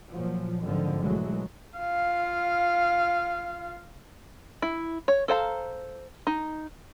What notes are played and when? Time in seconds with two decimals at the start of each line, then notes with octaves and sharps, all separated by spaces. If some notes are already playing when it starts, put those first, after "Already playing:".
0.11 A#2 F3 F#3
0.63 G#1 D3 D#3 F3
1.01 B1 E3 F#3 G#3 A3
1.79 F4 F5
4.62 E4
5.08 C#5
5.28 A4 C5 F5 A#5
6.27 D#4